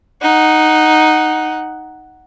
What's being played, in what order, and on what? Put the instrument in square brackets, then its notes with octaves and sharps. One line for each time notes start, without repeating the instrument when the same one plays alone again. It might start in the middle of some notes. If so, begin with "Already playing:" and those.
[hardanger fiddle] D#4 F#5